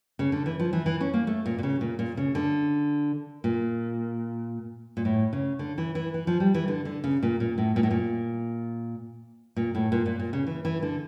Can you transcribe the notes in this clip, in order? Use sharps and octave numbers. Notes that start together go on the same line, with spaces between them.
C#3
D3
E3
F3
E3
E3
C#4
A#3
A3
A#2
A#2
C#3
A#2
A#2
C#3
D3
A#2
A#2
A2
C#3
D3
E3
E3
E3
F3
G3
E3
D3
D3
C#3
A#2
A#2
A2
A#2
A2
A#2
A#2
A2
A#2
A#2
A#2
C#3
E3
E3
D3